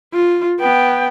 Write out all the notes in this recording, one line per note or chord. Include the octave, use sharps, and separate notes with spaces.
F4
B3 G5